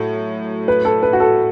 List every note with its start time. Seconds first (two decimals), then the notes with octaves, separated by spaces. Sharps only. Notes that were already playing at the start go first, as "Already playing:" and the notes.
Already playing: A2 F#3 A3 E4
0.68 B4
0.85 A4
1.03 B4
1.13 F#4
1.20 A4